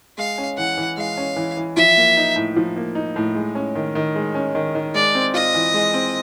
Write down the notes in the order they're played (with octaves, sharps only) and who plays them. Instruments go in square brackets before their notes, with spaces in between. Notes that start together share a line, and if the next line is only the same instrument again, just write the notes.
[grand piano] G#3 [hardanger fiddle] F5
[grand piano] C#4
[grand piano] E3 [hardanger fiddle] F#5
[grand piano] E3
[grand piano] G#3 [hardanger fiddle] F5
[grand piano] C#4
E3
E3
[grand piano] F3 [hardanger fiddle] E5
[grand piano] A#3
D#4
A2
F3
A#3
D#4
A2
G#3
C#4
D#3
D#3
G#3
C#4
D#3
D#3
[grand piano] G#3 [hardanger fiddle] D5
[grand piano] C4
[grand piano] F4 [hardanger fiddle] D#5
[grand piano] E3
G#3
C4